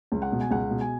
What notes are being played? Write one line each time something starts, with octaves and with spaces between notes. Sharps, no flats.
C#2
F#5
B2
G#5
C#2 F#5
B2
G#5